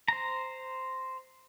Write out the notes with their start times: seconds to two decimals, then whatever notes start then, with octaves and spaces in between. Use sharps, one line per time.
0.08 C5 A#5